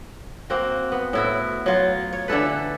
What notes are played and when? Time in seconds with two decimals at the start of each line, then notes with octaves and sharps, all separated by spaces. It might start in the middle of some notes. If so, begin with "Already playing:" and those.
0.50 A#3 C4 F#4
0.92 B3
1.13 A2 E4 F#4
1.66 F#3 F4
2.13 C#5
2.28 D3 E3 A4 B4